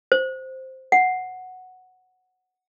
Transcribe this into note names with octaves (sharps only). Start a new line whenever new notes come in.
C5
F#5